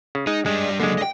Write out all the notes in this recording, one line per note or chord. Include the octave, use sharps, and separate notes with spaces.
C#3
G#3 D#4
G3 G#3 D4
D3 F#3 G#3 A#3
D#5 G5